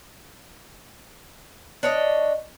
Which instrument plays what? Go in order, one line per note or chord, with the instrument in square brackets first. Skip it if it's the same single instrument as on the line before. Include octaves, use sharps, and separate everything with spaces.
[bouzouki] D4 C#5 D#5